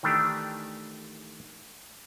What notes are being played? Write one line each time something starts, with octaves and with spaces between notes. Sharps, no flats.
D#3 E3 A3 D4 G4